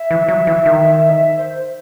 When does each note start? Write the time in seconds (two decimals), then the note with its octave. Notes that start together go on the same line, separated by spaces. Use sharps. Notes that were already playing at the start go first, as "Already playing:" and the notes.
Already playing: E5
0.11 E3
0.29 F#3
0.47 E3
0.66 D#3
1.38 C5